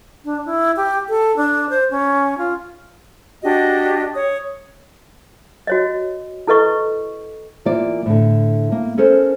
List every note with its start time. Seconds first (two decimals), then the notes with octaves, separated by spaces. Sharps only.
0.25 D4
0.46 E4
0.76 G4
1.09 A4
1.37 D4
1.69 C5
1.91 C#4
2.38 F4
3.42 D4 F#4 G4 D#5
4.14 C#5 D#6
5.67 F#4 C#5 D#5
6.47 E4 A4 B4 D#5 C#6
7.65 E3 A#3 F4 D5
8.06 A2 D3
8.72 A#3
8.98 C#4 A4 A#4 C5